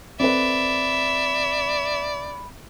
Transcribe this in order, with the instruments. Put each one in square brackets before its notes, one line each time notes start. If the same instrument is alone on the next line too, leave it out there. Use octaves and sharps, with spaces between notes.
[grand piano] C4 A4 B4 [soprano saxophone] D5 [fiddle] E5 [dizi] B5